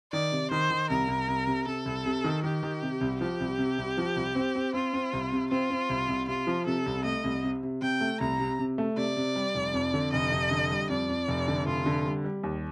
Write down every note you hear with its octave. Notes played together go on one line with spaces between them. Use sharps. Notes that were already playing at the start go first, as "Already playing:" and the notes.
D#3 D5
C3
D#3 C5
D#3
C2 A#4
C2
C2
C3
C3 A4
C2
C3
D#3
D#3 G4
D#3
C3
C2
F3 G4
C2
C3
C2
F3
C2
C4
C4
C4 F4
C4
C2
C3
C4 F4
C4
C2
C2
C3 F4
F3
C3 A4
C2
A3 D#5
C2
C3
C3
C3 G5
A3
C2 A#5
C3
C3
A3
C3 D5
C3
G3
F1
F2
D3
F1 D#5
F1
D3
G3
F2 D5
F2
F1
D3
F1 F4
D3
G3
G3
D#2